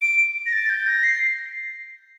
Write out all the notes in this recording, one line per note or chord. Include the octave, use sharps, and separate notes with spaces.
D7
A#6
A6
G6
A#6
C7